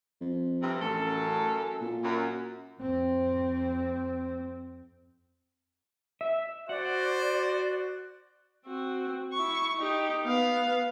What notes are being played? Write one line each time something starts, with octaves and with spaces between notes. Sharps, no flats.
F2
G2 C3
A1 F#2 A4
A#2
F#2
F2 C4
E5
F#4 C5 D5 F#5
C4 F#4
E4 C#6
D#4 G4
B3 F5